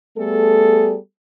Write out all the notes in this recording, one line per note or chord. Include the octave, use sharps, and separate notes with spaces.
G3 A3 B3 G#4 A4